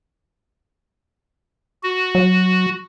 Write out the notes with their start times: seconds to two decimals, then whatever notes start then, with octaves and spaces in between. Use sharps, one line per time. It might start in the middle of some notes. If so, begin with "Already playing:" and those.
1.83 F#4
2.15 F#3